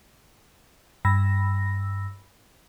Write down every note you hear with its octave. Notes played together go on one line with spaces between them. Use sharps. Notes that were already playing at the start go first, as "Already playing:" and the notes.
G2 B5 E6 A#6